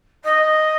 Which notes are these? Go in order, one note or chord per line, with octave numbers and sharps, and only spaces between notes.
D#5